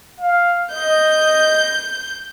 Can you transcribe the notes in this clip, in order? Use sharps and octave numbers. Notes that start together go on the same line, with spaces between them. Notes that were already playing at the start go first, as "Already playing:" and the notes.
F5
D#5 G6